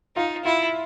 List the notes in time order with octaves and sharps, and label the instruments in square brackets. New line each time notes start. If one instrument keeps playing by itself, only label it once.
[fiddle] D#4 [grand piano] F4
[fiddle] E4 [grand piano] F4